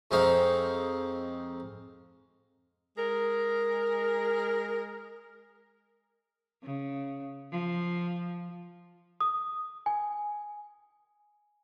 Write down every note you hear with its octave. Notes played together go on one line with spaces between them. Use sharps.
F2 G#3 C4 D#4 F5 C#6
G#3 G#4 A#4
C#3
F3
D#6
G#5